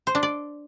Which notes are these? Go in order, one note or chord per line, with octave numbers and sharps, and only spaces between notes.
C5
D4
D5